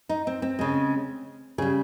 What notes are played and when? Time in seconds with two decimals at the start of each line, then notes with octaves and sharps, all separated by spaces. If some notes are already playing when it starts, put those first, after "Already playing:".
0.09 D#4
0.27 C4
0.42 C4
0.59 C#3 G#3
1.58 C#3 G3 G#4